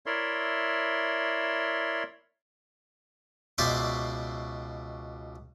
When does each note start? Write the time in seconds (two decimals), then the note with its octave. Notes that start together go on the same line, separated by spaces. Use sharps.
0.06 E4 A#4 C#5 D5 E5 C6
3.58 C#2 B2 C5 D5 E5 C6